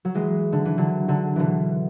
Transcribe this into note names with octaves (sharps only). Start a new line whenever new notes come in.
F#3
E3 G#3
D3
E3
D3 F#3
D3 F#3
B2 D3 E3